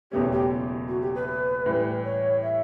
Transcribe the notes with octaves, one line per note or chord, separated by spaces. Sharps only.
F#1 E2 B2 A3 C#4 G4
G4
F#4
G4
B4
A2 E3 G3
C#5
E5